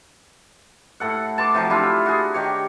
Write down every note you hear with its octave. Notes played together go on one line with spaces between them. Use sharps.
A2 A4 F#5
A5 C6 D6
C3 F3 F#3
D4 E4 F4
F#4 G#4
D#3 G4 C#5